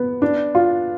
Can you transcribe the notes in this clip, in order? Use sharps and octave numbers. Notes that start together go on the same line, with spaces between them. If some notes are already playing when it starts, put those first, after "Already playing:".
Already playing: B3
D4
F4